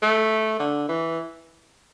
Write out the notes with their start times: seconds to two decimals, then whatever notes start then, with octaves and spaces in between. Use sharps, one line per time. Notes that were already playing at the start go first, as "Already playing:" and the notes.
0.02 A3
0.59 D3
0.88 E3